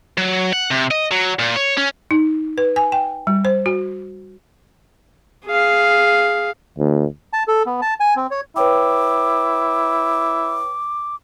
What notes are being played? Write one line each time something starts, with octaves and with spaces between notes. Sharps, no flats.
F#3
F#5
C3
D#5
F#3
A#2
C#5
C#4
D#4
B4
G#5
G5
G3
C5
F#4
G#4 F5
D2
A5
A4
B3
A5
G#5
C4
C#5
E4 B4 C#5 G5 D6